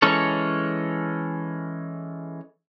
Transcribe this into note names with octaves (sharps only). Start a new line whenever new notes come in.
E3 G#3 C#4 A4 C#5